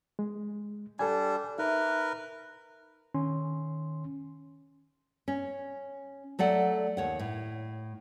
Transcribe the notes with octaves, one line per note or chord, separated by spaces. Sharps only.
G#3
G3 D4 A4 G#5
D#4 A#4 B4 E5
D#3 C#4 C6
C#4
F#3 A3 D5 F#5
D#2 C#5 F#5
A2